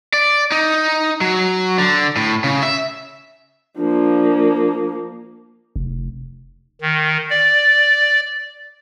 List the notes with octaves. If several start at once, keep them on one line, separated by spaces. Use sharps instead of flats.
D5
D#4
F#3
D3
A2
C#3
E5
F3 A#3 D4
F1
D#3
D5